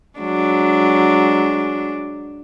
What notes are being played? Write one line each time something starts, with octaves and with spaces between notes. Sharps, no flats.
F#3 G#3 D4